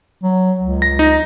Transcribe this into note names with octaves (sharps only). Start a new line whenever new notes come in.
F#3
C#2
A#6
D#4